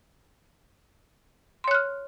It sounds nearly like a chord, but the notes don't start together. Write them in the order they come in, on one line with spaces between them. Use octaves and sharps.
C6 C#5 F#6 F6